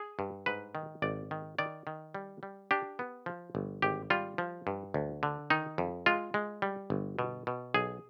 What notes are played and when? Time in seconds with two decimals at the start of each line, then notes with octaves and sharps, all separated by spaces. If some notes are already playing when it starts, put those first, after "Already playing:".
Already playing: G#4
0.19 G2
0.46 G#2 B4
0.75 D#3
1.02 G#1 D5
1.31 D#3
1.59 D#3 D5
1.87 D#3
2.15 G3
2.43 G3
2.71 D4 G4
2.99 B3
3.26 F3
3.55 G1
3.82 G#1 G4
4.10 G3 F4
4.38 F3
4.67 G2
4.94 D2
5.23 D3
5.50 D#3 D#4
5.78 F2
6.06 G#3 F4
6.34 G#3
6.62 G3
6.90 G1
7.19 B2
7.47 B2
7.74 B1 G#4